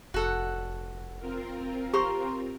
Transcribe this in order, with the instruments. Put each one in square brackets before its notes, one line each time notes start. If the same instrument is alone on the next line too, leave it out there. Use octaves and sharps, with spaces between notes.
[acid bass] F1 [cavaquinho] F#4 A4 F#5
[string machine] C4 F4 A#4
[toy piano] G4 C#6 [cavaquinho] C5 A#5 C6